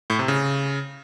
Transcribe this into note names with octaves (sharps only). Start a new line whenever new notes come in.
A2
C3
C#3